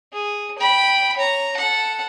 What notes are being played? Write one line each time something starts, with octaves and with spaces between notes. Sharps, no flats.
G#4
G5 B5
C#5 A#5
A4 F#5